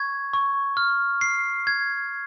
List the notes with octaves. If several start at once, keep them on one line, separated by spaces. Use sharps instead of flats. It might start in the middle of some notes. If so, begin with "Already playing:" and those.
Already playing: C#6 G#6
C#6
F6
C7
G#6